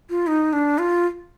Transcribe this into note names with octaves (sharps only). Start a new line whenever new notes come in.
F4
D#4
D4
F4